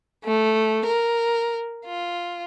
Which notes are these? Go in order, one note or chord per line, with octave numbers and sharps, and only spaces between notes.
A3
A#4
F4